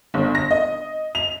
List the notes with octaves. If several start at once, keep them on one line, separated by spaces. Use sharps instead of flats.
G1
A#6
D#5
F7